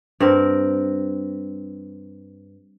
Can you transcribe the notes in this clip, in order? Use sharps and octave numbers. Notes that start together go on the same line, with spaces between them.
G2 C4 A#4